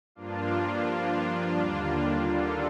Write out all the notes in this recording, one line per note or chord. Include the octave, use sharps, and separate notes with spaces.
G2 F3 A#3 D4 F4
D4 F4
D#2 D3 G3 A#3
F4 A4